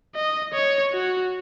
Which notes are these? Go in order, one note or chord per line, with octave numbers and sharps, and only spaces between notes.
D#5
C#5
F#4